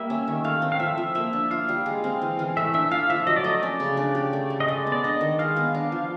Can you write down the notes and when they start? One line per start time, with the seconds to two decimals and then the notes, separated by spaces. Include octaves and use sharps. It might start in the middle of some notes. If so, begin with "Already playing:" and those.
Already playing: G3 A#3 E5
0.10 C#4
0.27 D#3
0.44 A3 F5
0.62 C4
0.72 F5
0.80 F3 E5
0.98 F3
1.15 A#3 E5
1.33 D4
1.51 F4 F5
1.69 G3
1.86 G#3
2.04 C4
2.21 E3
2.39 E3
2.57 A3 E5
2.74 D4 E5
2.91 F4 F5
3.10 F3 E5
3.27 F#3 D#5
3.36 D5
3.44 A3 D#5
3.62 C#4 D5
3.80 C#3
3.97 D4
4.15 G4
4.33 A3
4.50 A3
4.60 D#5
4.68 G#3 D5
4.87 B3
4.92 D5
5.04 D4 D#5
5.21 D#3
5.39 G#3 F5
5.56 B3
5.75 D4
5.92 F3